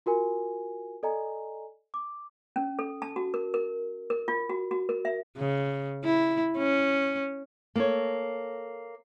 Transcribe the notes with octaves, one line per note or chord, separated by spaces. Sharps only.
F4 F#4 A#4 G#5
A4 D5 D#5 G#5 A#5
D6
C#4
A4
A5
F#4
A#4
A#4
A#4
F4
F#4
F#4
A#4
E5
C#3
E4
C#4
A#3 A4 C#5